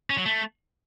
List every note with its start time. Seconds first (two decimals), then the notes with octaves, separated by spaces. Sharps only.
0.10 C#4
0.18 F#3
0.25 A3